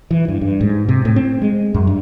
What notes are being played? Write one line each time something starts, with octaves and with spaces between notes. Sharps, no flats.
E3
G2
G2
G#2
C3
A2
C4
G#3
F#2
G2